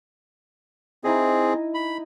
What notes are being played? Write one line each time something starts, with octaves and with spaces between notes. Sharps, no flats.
C4 D#4 E4 G#4 D#5
B5